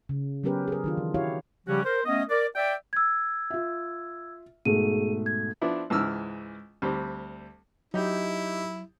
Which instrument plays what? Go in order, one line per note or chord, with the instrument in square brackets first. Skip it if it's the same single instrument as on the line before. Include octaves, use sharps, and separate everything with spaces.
[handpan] C#3
F#3 B3 C#4 G4 A#4 B4
G#4 A#4
D#3 D4 F4
E3
E4 F#4 G4 C#5 F5
[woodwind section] C#3 F3 G3 C#4 F#4 G4
A#4 C5
A3 B3 C#4 D#5
A#4 D5
D5 E5 G5
[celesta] E6 G#6
[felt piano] F4 E5
[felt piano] G#2 B2 A3 [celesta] G#4 D#7
[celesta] G#6
[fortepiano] F3 B3 D4 E4
C#2 G#2 E3 E6 F6
D2 G3 C4
[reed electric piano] F#3 [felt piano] D#4 G4 [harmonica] E4